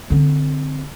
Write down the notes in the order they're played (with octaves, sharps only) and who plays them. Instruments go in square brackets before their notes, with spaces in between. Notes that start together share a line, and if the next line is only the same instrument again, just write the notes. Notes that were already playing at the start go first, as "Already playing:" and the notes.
[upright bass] D3 C4